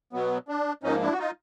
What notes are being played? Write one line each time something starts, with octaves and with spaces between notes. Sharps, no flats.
B2 F#3 B3
D4
G#2 F3 A#3 C#4 D#4
D4 E4
F#4
D#4 F4